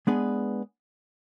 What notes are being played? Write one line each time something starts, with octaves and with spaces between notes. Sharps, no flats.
G#3 B3 D4 G#4 B4